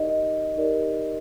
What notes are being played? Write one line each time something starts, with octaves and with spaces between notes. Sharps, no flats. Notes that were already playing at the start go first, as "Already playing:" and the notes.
Already playing: D#4 G4 A#4 D5 D#5
D#4 G4 A#4 D5